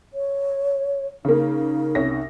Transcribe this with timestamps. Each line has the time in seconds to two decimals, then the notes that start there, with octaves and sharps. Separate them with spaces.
0.14 C#5
1.25 C#3 A#3 D#4
1.95 C2 C#4 A#6